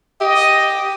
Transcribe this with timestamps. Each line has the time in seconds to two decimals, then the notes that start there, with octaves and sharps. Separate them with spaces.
0.21 G4 D#5